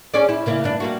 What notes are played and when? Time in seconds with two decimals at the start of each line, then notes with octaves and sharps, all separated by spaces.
0.14 C#4 G#4 D5
0.29 E4
0.46 C#3 A#3 E4
0.64 G2 D4
0.80 G3 A#3 F#4